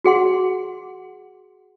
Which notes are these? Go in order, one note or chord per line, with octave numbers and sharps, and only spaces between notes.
F#4 G#4 F#5 C6